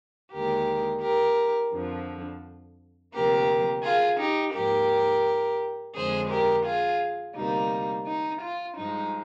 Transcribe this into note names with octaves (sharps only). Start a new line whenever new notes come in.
D#2 D3 G#3 G4 A#4
G4 A#4
F2 D3 F3
D2 C3 F3 A#3 G4 A#4
F4 G#4
D#4 G4
G#2 F3 A#3 G4 A#4
F2 D3 G#3 G#4 C5
G4 A#4
F4 G#4
D2 C3 G3 A#3 D#4
D#4
F4
G2 F3 G#3 D#4